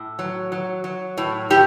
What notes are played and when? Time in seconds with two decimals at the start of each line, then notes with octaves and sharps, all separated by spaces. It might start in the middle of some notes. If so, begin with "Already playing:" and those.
Already playing: A2
0.19 F#3
0.52 F#3
0.84 F#3
1.18 A2
1.50 A2 G4